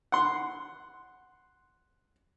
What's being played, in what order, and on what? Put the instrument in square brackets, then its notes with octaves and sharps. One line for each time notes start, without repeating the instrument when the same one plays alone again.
[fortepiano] F#5 C6